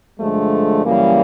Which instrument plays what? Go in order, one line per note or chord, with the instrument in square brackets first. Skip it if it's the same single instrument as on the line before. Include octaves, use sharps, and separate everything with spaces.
[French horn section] G2 D3 F3 G#3 A3
F#2 C#3 E3 G3 A#3